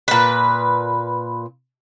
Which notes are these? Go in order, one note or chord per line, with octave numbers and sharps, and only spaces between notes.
A#2 B4